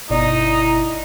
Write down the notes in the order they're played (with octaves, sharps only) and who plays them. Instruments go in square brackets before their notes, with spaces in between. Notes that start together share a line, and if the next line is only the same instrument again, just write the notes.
[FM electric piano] G1 B2 D5 [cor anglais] D#4 [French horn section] E4